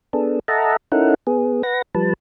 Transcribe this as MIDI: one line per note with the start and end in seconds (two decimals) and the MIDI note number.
0.13 0.39 59
0.13 0.39 62
0.13 0.39 68
0.13 0.39 69
0.48 0.76 69
0.48 0.76 75
0.48 0.76 76
0.48 0.76 78
0.48 0.76 81
0.48 0.76 82
0.92 1.14 61
0.92 1.14 63
0.92 1.14 64
0.92 1.14 69
0.92 1.14 70
0.92 1.14 78
1.27 1.62 59
1.27 1.62 68
1.63 1.82 71
1.63 1.82 78
1.63 1.82 94
1.95 2.13 53
1.95 2.13 55
1.95 2.13 71
1.95 2.13 81